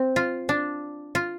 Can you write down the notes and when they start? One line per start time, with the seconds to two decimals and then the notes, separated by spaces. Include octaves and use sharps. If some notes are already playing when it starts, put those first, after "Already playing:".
Already playing: C4
0.16 F4
0.49 D4
1.15 F4